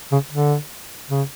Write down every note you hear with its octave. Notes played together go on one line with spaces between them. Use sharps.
C#3
D3
C#3